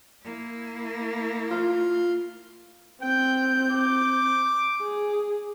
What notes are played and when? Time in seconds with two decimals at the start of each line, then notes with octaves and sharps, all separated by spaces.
0.23 A#3 E4
1.51 F4
3.02 C4 G5 G6
3.71 D6
4.82 G#4